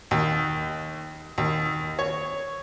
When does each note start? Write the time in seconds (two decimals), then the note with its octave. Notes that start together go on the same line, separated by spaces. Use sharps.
0.11 D#2
1.38 D#2
1.99 C#5